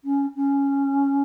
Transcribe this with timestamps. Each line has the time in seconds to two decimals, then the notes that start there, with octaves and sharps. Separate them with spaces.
0.05 C#4
0.36 C#4